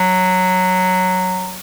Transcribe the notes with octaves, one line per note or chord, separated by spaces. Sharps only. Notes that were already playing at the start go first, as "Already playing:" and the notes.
Already playing: F#3